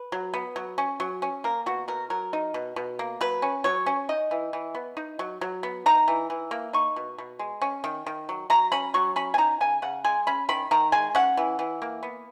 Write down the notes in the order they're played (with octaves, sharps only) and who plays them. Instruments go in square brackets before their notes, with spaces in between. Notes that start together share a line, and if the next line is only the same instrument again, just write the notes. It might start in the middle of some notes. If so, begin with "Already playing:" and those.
Already playing: [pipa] B4
F#3
B3
F#3
C#4
F#3
C#4
A#3 A#4
B2 F#4
B2 A#4
F#3 A#4
D#4
B2
B2
A#3
F#3 B4
C#4
F#3 C#5
C#4
D#4 D#5
E3
E3
B3
D#4
F#3
F#3
B3
D#4 A#5
E3
E3
A#3
D#4 C#6
B2
B2
G#3
C#4
D#3
D#3
F#3
F#3 A#5
C#4 B5
F#3 C#6
C#4 B5
G#5
D#4 A#5
C#3 G#5
C#3 F#5
G#3 G#5
C#4 B5
D#3 B5
D#3 A#5
G#3 G#5
C#4 F#5
E3
E3
A#3
B3